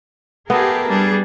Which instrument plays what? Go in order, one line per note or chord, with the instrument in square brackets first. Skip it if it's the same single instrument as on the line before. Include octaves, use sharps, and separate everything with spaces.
[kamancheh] A3 [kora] B3 [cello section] G4 G#4 A#4
[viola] G3 [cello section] D4 G#4